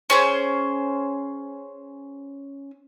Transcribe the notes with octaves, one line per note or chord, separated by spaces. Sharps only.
C#4 G#4 C5